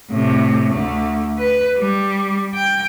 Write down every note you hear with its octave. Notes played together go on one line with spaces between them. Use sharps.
A2 C3
D2 A3
B4
G3
G5